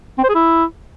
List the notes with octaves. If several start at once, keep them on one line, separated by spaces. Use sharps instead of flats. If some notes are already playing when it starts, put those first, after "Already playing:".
C4
C5
G#4
E4